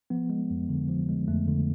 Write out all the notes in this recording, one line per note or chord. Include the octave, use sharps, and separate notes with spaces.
F3 B3
G#3
F2
D3
F3
G#3
F2 A3
D3